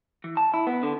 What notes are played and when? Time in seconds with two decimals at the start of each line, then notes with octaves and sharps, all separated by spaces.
0.24 E3
0.37 A5
0.54 E4
0.67 B3
0.83 D3